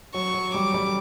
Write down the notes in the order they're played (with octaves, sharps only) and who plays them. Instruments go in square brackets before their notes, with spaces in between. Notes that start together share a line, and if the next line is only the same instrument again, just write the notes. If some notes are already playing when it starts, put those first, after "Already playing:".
[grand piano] F#3 [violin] C#6
[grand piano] F#3
[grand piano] G3 [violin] D6
[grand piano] G3